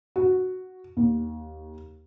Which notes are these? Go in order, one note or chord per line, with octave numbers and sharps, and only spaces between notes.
F#4
D#2